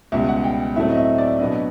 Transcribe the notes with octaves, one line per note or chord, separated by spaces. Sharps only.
C#2 B2 G3 E5
F#5
G5
A2 F#3 A3 C4 E5
D#5
E5
D5
B2 F#3 B3 D4 D#5